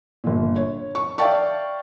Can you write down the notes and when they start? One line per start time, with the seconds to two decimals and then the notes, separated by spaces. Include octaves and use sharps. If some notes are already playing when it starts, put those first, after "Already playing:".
0.24 G1 A#2
0.56 C#5
0.95 C#6
1.18 D5 E5 F5 G5 A5 C#6